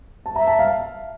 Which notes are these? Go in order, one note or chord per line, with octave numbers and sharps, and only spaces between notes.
A5
E5 A#5
A5
F5